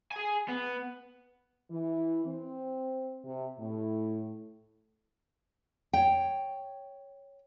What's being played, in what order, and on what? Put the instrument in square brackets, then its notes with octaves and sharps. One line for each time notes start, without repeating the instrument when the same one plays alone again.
[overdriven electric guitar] G#4 G#5
B3
[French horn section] E3
C4
C3
A2
[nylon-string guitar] C#5 G5